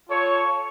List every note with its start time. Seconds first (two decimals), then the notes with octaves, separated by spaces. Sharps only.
0.08 F4 A4 C#5